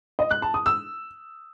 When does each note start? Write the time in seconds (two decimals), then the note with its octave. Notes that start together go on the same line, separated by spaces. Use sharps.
0.19 D#5
0.31 F#6
0.42 A5
0.54 D#6
0.66 E6